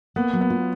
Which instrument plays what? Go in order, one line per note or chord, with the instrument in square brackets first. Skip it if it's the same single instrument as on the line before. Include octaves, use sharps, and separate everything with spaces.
[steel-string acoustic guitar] A#3 [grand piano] B3
[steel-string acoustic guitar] F#3
[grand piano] B3
[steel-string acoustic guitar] F4